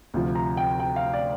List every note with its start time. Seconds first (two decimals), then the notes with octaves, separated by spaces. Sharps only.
0.14 D2 C3 F3
0.35 A#5
0.57 G5
0.80 G5
0.96 F5
1.13 D5